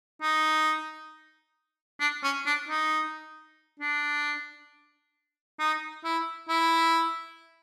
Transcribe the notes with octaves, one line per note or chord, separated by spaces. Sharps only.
D#4
D4
C#4
D4
D#4
D4
D#4
E4
E4